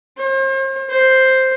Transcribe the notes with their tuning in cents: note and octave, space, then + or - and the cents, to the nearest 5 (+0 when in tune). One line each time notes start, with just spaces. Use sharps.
C5 +40
C5 +0